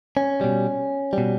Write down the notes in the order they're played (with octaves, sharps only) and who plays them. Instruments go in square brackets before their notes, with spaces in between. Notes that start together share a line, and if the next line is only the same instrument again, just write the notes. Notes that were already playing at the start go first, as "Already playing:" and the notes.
[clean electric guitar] C#4
B2 G3
B2 G3